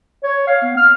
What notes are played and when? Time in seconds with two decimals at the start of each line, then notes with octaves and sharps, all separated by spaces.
0.24 C#5
0.47 F5
0.63 B3
0.77 F6